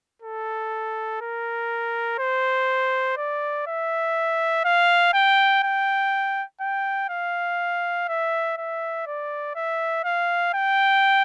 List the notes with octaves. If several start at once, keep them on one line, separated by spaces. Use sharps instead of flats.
A4
A#4
C5
D5
E5
F5
G5
G5
G5
F5
E5
E5
D5
E5
F5
G5